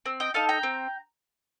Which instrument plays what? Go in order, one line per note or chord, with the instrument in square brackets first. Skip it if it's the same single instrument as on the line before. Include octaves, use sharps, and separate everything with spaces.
[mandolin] C4
D#5 G5
D#4 A4 F5 A5
G5 A#5
C4